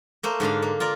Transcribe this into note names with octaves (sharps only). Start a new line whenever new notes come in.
A3 A#3 C5
G#2 D3 D4 F5
A#3
F4 A#4 D5